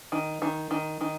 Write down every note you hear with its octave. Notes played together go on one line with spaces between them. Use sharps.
D#3
D#3
D#3
D#3